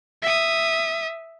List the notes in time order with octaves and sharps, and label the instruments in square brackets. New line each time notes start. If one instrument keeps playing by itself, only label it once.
[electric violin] E5 D#6